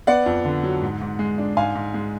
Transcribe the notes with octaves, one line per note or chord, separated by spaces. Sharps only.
B3 D5 F#5
F2
D3
F#3
G#2
G#2
G#3
D4
G#2 F5 G#5
G#2
G#3